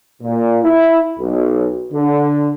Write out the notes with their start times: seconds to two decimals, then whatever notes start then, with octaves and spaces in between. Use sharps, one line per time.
0.22 A#2
0.63 E4
1.19 B1
1.93 D3